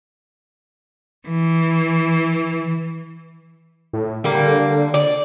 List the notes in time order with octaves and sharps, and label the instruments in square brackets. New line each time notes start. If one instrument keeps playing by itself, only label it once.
[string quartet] E3
[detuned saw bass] A2
[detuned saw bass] D3 [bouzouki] G3 A#3
[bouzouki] D5